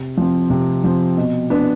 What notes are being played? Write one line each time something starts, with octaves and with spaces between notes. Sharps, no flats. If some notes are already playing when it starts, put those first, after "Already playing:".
Already playing: C3
F3 C4
C3
F3 C4
B2
B3 D4